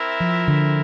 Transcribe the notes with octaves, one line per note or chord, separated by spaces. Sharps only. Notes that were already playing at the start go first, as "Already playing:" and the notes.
Already playing: C4 E4 A#4 E5
F3
D3